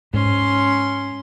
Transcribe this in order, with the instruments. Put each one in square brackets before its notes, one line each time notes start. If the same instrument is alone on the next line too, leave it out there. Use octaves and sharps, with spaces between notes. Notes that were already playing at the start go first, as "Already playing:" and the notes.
[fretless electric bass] G#2 [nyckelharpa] C#4 C6